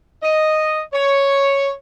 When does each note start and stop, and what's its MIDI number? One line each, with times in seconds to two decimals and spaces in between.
0.23 0.80 75
0.93 1.71 73